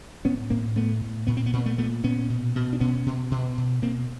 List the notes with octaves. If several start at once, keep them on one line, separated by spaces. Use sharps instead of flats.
A2 B3 C#4
A2 A#3 C4
A2 A3 B3
A2
A#2 B3
C4
B3
A#2 C4
A3 B3
A#2 A3 B3
A#2 B3 C#4
B2
B2
D4
B2 B3 C#4
B2
B2
B2
B2 A#3 C4